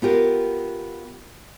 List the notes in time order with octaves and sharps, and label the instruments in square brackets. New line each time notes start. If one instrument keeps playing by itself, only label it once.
[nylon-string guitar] B3 F4 G4 A#4